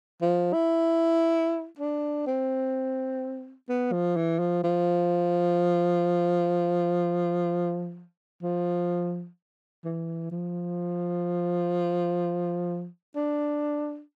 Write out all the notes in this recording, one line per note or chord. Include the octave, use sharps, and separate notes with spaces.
F3
E4
D4
C4
B3
F3
E3
F3
F3
F3
E3
F3
D4